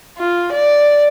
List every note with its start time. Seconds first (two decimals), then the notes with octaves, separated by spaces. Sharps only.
0.18 F4
0.52 D5